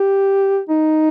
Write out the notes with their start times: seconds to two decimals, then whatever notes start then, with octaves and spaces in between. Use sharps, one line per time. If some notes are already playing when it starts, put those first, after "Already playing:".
Already playing: G4
0.69 D#4